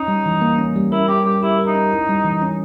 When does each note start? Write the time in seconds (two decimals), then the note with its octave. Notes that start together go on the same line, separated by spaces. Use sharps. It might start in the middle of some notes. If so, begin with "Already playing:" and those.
Already playing: C#4 D#4
0.08 G3
0.26 E3
0.41 A#3
0.58 C#4
0.76 G3
0.92 E4 A#4
1.08 C#4 G4
1.26 G3 G4
1.43 E4 G4
1.59 A#4
1.67 D#4
1.75 C#4
1.92 E4
2.09 G3
2.25 E3
2.42 C#4